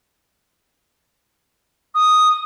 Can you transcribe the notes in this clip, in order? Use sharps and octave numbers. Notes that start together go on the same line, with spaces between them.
D#6